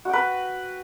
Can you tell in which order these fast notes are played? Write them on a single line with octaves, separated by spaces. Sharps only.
F#4 G5 B4